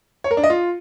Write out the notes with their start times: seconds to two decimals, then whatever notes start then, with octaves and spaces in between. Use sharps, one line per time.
0.24 C#5
0.31 A#4
0.37 D4
0.43 D#5
0.50 F4